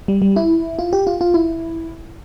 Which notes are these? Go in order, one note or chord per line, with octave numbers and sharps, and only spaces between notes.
G3
G3
E4
F4
G4
F4
F4
E4